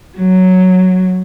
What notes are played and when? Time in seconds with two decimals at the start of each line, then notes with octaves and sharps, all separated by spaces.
0.18 F#3